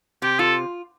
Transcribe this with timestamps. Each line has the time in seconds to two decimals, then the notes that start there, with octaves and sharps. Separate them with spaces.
0.22 C3 G4
0.39 F4 A4